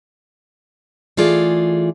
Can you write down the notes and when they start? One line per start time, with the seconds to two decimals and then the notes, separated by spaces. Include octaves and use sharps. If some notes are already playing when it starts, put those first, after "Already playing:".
1.17 E3 A3 F4 G#4 D5